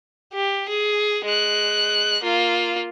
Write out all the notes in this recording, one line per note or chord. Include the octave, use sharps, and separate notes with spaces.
G4
G#4
G#3 F#6
A#3 F4